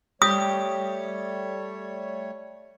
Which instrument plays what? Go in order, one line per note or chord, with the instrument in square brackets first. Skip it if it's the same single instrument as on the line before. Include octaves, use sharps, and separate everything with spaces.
[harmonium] G3 A3 C#5 [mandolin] G4 [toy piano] D#6